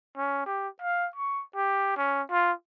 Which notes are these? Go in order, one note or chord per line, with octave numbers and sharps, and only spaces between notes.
C#4
G4
F5
C#6
G4
C#4
F4